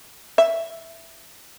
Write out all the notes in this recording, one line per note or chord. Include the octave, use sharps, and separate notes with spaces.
E5